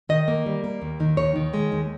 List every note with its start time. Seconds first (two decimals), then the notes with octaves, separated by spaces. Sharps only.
0.09 D#3 D#5
0.28 A#3
0.46 G3
0.64 A#3
0.82 D#2
1.00 D#3
1.17 D#2 C#5
1.36 D#3
1.54 G#3
1.72 D#2